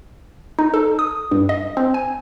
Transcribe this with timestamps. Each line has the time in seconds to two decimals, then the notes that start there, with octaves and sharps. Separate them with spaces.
0.59 D#4
0.74 A4
0.99 D#6
1.31 G2
1.49 D#5
1.77 C4
1.94 G#5